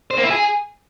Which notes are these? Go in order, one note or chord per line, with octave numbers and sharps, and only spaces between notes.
C5
A#3
E4
G#4